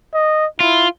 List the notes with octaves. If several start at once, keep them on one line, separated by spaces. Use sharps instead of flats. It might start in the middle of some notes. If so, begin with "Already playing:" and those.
D#5
E4 F4